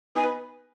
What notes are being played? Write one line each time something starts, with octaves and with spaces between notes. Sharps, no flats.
B3 D#4 G#5
B4